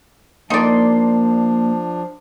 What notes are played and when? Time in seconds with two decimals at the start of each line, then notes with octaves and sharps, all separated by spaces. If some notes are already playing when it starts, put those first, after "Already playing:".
0.50 F3 A#3 D4 D#4 D5 C6